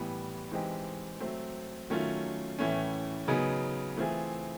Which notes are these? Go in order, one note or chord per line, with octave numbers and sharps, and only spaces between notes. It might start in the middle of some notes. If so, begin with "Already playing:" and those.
Already playing: A2 E3 G3 B3
E3 G#3 C4 D#4 G4
F#3 A3 C4
D#3 F#3 A3 C#4 F4
A2 E3 A3 C#4
C#3 F#3 B3 D#4 G#4
E3 A3 C4 F4 G#4